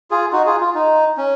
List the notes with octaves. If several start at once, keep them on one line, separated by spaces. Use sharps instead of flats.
F4 G#4
D#4 F#4
F4 G#4
F4
D#4
C#4